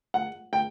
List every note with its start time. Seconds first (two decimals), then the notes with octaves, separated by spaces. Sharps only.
0.14 F#5
0.53 G5